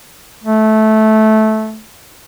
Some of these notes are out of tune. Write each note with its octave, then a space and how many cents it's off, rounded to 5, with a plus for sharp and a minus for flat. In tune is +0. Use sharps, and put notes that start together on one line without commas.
A3 -15